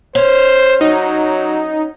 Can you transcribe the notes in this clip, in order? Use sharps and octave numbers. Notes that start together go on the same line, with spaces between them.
C#4 C5
F#3 D#4